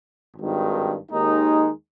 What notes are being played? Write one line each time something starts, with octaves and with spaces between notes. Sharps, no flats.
G#1 G2 D#3
D#2 D#3 G#3 D#4